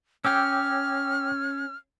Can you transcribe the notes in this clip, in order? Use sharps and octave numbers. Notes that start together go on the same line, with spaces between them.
C#4 G5 D6 E6 F6